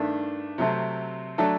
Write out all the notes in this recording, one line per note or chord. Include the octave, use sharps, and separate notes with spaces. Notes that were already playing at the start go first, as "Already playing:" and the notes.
Already playing: G2 D#3 A3 D4
C3 F#3 A3 C4
F#3 A3 D4 A4